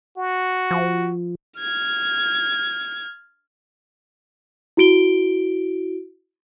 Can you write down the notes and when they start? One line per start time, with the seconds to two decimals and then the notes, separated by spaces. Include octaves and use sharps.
0.17 F#4
0.71 F3
1.60 F6 G#6
4.77 E4 F#4 D7 G7